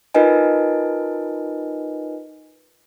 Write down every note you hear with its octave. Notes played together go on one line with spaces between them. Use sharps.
D#4 F4 A#4 B4 D#5 G#5